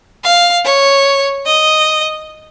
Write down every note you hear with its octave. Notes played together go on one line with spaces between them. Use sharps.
F5
C#5
D#5